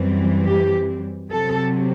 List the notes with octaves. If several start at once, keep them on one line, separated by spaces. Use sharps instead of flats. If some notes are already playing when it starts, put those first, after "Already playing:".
Already playing: F#2 E3 G3 C4
G4
C3 F#3 C4 A4